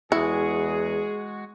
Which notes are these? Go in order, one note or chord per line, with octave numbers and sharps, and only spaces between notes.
E2 G#3 E4 F#4 G#4